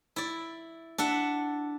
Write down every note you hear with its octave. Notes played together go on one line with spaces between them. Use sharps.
E4 D5
D4 E5 F#5